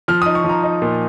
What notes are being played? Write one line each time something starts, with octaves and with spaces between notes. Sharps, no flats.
F3 F6
D#4 D#6
C#6
F3 A#5
D#4
A#2